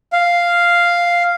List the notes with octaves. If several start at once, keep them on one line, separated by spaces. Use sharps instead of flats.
F5